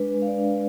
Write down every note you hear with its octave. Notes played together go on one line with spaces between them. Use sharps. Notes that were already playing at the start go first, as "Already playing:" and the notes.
Already playing: G#3 D4 B4
G#3
F5
D5
D4